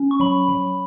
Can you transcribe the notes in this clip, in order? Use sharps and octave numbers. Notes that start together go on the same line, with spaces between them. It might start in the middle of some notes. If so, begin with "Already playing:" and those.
Already playing: C#4
C#6
F#3 B5
F#3